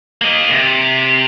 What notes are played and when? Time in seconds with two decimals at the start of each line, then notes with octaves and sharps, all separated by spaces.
0.21 A#3 D#5
0.51 C3